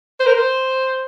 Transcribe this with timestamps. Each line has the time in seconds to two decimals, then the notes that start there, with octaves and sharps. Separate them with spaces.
0.20 C5
0.27 A#4
0.34 C5